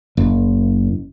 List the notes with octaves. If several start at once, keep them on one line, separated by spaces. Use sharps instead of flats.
F#1